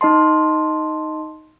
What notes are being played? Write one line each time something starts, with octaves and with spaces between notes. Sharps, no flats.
D#4 D#5 A5 C6